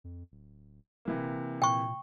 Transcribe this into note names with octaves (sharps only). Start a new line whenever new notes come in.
F2
D1
D#1 C3 E3 A#3
A#2 G5 C#6